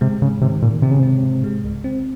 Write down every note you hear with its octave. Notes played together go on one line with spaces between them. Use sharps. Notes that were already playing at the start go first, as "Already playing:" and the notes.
C3 G#3
G#2 C#3
C3 D#3
A#2 D#3
C3 C4
C#3
C3 C4
G#2
G#3
C#2
C4